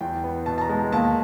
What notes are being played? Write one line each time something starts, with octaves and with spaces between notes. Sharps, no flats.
E2 G5
B3
B2 A5
A5
A#5
G#3
D#2 A5